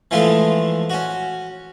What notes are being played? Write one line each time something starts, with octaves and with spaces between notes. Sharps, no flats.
E3 F3 G#3 A3 F4 A4
C#4 F#4